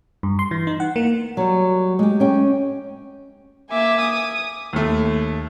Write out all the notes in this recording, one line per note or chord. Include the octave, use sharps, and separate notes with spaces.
G2
C6
E3
D#4
F#5
A#3
F#3 G3
G#3 G4
C#4 G5
A#3 E5 G#5 D6
D#6
D#2 A3